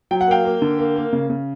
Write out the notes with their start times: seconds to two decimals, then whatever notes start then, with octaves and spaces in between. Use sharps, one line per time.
0.11 F#3 G5
0.21 F#5
0.28 A#3 F5 G5
0.45 A#3
0.62 D3
0.79 A#3
0.96 A#3
1.13 C#3
1.30 C#3